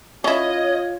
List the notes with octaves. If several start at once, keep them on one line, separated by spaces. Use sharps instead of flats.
C#4 E4 F4 C#5 D#5